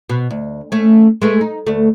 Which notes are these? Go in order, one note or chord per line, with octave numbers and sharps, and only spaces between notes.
B2
D2
A3 C#4
G#3 A3 B4
D#4
D2 A3